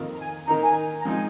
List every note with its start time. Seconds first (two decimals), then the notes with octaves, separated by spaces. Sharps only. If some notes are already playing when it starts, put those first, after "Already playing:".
Already playing: F2 D#3 A#3 F4
0.14 A#5
0.19 G#5
0.47 D#3 A#3 D#4 A#5
0.62 G#5
1.00 A#5
1.05 F3 G#3 C4 D#4 G#5